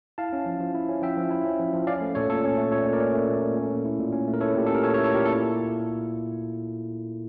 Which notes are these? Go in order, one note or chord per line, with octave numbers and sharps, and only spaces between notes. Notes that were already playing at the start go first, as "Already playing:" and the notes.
E4 F5 A5
C#4
F3
F3
E4
C#4
F3 E5 G5
F3
E4
C#4
F3
F3
C#4 D5 F5
A3
A#2 A4 C#5
A#2 A4 C#5
C#4
A3
A#2 A4 C#5
A#2
A#4 D5
C#4
A3
A#2
A#2
C#4
A3
E4
A#2
C#4
A3
A#4
E4 A4 C#5
A#2 G4
C#4 A4
A#4
A3 A4 C#5
A4 C#5
E4
A4 C#5
A#2 G4 A#4
E4 A4